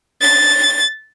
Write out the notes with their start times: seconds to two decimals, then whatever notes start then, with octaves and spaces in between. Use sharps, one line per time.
0.21 A6